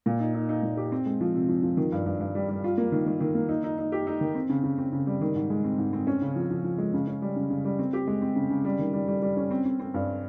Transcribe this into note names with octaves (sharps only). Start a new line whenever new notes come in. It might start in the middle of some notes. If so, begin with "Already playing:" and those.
A#2
D#4
D#4
D#4
A#2
G4
C4
G#3
F3
C3
F3
F3
D#3
G2
G2
G2
G3
G3
F4
A#3
D#3
D#3
D#3
A#3
D#4
D#4
D#4
G4
D#4
D#3
C4
C#3
C#3
C4
C#3
G3
D#3
G#2
G#3
C4
G#2
C4
C#4
C#3
F3
F3
F3
G#3
C#3
C#4
G3
C#3
C#3
G3
C4
G4
G#3
C4
C#3
C#3
G3
D#3
G3
G3
G3
C#4
C4
C4
C4
G2